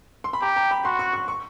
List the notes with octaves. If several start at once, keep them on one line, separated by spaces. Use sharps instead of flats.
C6
B5
G4 A#5
A#5
B5
F#4 C6
C#6
C#6
C#6